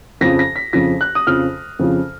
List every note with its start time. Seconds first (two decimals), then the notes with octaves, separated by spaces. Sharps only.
0.21 F2 C#3 F3 A#6
0.39 A#6
0.56 B6
0.73 F2 C#3 F3 A#6
1.01 F#6
1.15 D#6
1.27 F2 C#3 F3 F6
1.79 F2 C#3 F3